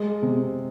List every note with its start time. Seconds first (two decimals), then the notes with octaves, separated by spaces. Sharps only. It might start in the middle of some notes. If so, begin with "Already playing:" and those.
Already playing: G#3
0.22 C3